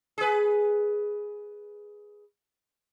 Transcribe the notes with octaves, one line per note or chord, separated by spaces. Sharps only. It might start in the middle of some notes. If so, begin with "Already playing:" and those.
G#4 B4